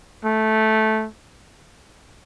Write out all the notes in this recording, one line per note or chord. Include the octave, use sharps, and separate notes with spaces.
A3